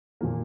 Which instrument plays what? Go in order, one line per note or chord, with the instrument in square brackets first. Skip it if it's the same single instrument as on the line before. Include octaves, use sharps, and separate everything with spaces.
[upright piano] A#2 F3 A#3